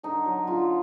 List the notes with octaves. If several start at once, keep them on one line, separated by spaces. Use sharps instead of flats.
D3 D#4
F#3
D3 F4